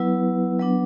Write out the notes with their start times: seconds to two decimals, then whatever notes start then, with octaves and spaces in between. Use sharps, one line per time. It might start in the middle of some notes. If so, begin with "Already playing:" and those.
Already playing: F#3 B3 E4 B4
0.59 F#3 B3 D4